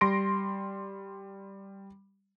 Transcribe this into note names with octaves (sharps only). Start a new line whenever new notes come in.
G3 C6 A#6 D7